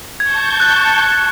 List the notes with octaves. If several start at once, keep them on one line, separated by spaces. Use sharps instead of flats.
A5 C#6 G6 G#6
F#6